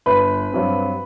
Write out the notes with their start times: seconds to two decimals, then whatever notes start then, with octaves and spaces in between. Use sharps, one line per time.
0.06 G1 B4 B5
0.52 G2 F#3 C4